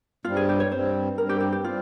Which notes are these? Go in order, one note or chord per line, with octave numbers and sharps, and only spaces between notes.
G2 G3 C4 F4
G#4
G4
C#5
G2 G3 C4 C5
G2 G3 C4 A#4
G4
G4
G4
G3 C4 F4